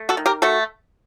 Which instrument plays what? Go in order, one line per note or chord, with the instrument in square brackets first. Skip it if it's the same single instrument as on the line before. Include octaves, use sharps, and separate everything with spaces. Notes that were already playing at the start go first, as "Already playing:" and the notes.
Already playing: [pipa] A3
F#4 A4
D#3
G4 A#4
A3 F#4 A4